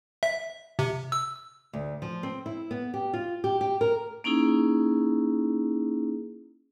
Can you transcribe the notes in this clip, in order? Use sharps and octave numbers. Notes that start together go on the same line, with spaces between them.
E5
C3
E6
D2
F3
C4
E4
B3
G4
F4
G4
G4
A#4
A#3 C#4 D#4 E4 G#4